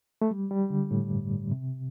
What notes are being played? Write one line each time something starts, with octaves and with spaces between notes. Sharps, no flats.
A3
G3
G3
D3
A2
G2
A2
C3